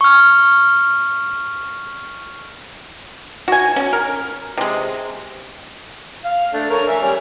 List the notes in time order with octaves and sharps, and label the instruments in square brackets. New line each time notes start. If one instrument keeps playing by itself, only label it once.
[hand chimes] C#6 F6
[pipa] F#4 G#5
C#4
A#4
C3 G#3
[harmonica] F5
A3 D4
A#4 C#5
E5 G#5
G3 C#4 D5